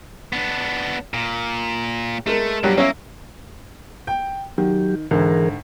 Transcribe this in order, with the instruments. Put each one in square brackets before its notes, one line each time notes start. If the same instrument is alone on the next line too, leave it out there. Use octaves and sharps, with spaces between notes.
[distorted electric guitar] B3 D4
A#2
[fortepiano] G#3 A#4 [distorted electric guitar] A3
[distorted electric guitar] G2 [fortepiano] F#3 G3
[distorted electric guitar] A#3 [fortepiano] C#4 E5
[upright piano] G5
[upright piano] D#3 [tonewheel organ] F#3 G4
[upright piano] G#1 D3 [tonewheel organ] E3 G#4 A#4